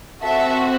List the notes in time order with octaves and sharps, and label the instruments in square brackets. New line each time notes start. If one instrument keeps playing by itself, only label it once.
[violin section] C4 F#4 A4 E5